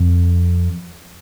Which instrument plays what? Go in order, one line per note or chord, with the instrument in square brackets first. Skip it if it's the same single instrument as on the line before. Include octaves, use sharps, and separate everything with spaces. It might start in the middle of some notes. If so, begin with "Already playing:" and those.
Already playing: [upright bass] F2